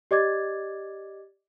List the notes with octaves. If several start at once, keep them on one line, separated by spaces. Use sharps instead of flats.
G4 D5 D#5 D6 G#6 A6